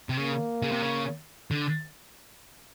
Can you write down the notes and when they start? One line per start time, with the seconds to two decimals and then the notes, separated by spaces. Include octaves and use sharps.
0.09 C3
0.17 C#3 A#3
0.62 C#3
0.72 C3
0.82 C#3
1.51 D3